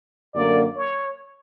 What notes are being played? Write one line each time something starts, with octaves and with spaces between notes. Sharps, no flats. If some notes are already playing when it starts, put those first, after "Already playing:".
F#2 D3 A#3 D5
C#5